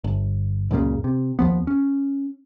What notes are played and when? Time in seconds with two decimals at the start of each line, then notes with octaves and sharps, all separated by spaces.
0.04 G1
0.71 C#2 F#2 A#2 C#3
1.04 C3
1.39 D#2 F3 B3
1.67 C#4